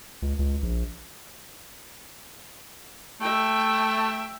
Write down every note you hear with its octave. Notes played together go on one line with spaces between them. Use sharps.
C#2
C#2
A#1
A3 E5 G5